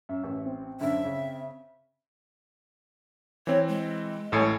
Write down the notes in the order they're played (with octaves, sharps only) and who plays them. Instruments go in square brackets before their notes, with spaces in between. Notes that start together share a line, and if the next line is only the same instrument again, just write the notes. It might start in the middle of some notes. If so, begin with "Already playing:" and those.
[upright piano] F#2 [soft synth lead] E5
[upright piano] A1
[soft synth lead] C4
[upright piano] F#2 D3 [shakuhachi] E5
[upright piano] C#3
[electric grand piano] E3 C4 [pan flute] C#5
[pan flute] G#3
[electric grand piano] A1 A2 C7 [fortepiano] A4 C#5 G#5